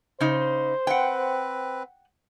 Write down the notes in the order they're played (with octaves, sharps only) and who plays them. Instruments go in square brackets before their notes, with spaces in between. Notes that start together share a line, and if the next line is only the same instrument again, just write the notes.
[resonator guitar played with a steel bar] C#3 D#4 [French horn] C5
[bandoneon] C4 B4 [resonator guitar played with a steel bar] F#5 G5